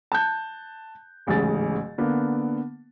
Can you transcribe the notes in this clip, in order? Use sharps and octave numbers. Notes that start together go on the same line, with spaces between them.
A5 F#6 G6
D1 A1 G#2 C#3 G#4 A6
D3 A#3 B3